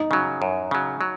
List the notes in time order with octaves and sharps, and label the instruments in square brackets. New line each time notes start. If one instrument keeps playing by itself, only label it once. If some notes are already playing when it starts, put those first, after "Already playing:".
Already playing: [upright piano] D#4
[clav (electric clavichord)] C#3 F#3
F#2
C#3 F#3
F#3